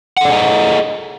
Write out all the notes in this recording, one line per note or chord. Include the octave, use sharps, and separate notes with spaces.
G#4 A4 D5 D#5 F#5